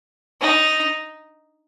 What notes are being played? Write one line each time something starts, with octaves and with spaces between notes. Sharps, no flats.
D#4